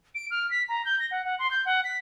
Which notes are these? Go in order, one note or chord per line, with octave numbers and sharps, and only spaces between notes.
D7
F6
B6
A#5
G6
A#6
F#5
F#5
C6
G6
F#5
B6